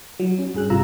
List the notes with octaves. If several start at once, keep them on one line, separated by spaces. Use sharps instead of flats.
F#3
C#4
G2 G#4 F#6
G#1 C3 G3 F4 A#5 E6